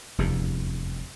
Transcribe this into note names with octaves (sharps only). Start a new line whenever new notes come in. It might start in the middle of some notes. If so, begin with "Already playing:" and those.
F1 E2 G2